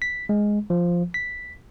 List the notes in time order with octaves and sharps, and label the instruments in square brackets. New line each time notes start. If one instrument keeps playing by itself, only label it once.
[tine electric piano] B6
G#3
F3
B6